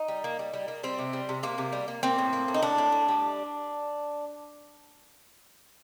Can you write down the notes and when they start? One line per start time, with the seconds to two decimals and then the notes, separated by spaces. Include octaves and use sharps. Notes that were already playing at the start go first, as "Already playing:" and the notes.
Already playing: D#4
0.08 G3
0.24 A#3
0.39 G3
0.54 G3
0.68 A#3
0.83 G3 C4
0.98 C3
1.13 G3
1.29 C3
1.43 C3 A#3
1.58 C3
1.73 G3
1.88 A#3
2.03 A#3 C4
2.18 A2
2.33 A#3
2.48 A2
2.54 D#4
2.63 A2 D4
2.78 A2
2.92 A2
3.08 G3